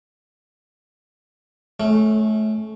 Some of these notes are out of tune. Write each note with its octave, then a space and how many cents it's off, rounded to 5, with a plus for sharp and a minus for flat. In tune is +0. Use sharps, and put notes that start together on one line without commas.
A3 -25 C#4 -5